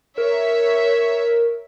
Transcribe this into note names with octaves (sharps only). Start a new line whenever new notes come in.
A#4 C#5 E5